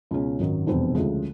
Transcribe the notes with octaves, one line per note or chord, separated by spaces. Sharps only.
C#2 B2 G#3 C#4
G#1 F#2 D#3 F#3
F1 E2 B2 G3 C4
D2 C#3 F3 G#3